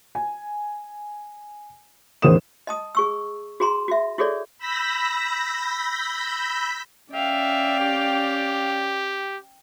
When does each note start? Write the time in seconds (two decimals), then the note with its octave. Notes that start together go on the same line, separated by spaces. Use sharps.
0.15 G#5
2.22 A1 E2 D#3 C5 D#6 E7
2.67 D#5 A5 D#6
2.95 G#4 C#6 E6
3.60 F#4 G#4 A#5 C6
3.88 F#4 E5
4.18 E4 F#4 G#4 A4 C#5 D5
4.58 B5 E6 G6 A#6 B6
7.13 C#4 D5 E5 F5 G5
7.80 G4